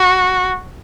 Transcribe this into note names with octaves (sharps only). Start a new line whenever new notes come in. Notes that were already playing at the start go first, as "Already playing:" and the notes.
Already playing: F#4